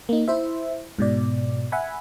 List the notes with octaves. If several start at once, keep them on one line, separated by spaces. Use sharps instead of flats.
A#3 D#4
E4 C5 E5
G#2 B2 D5
E5 F#5 G#5 B5